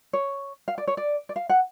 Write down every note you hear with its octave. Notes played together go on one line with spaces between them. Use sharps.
C#5
F5
D5
C#5
D5
D5
F5
F#5